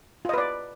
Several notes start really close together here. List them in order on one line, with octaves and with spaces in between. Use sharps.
F4 D#5 B4 D5